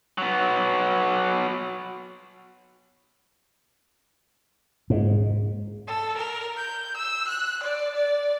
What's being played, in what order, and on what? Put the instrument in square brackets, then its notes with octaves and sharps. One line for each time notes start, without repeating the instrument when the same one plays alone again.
[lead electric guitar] F#3 B3
[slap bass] G#2
[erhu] A4
A#4
G6
E6
F#6
D5
D5